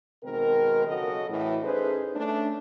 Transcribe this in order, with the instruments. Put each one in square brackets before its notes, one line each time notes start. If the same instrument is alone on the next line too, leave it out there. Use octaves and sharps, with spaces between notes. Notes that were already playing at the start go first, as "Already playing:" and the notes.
[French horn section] B2 D#3 G#3 C4 A#4
C#3 F#3 F#4 A4 D#5
A2 E3
C#4 D#4 G#4 A4 B4 C5
A3 C#4 D4